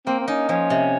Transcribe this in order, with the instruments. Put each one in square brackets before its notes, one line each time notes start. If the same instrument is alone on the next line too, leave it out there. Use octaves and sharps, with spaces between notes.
[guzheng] A#3 [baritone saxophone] C4
[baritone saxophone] C4
[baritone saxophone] C#4 [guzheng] D#4
[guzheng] F3 [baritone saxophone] C#4
[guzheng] C3